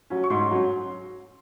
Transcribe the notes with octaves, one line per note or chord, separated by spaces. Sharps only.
F#3 C#4
C#6
G#2 C6
F#3 C#4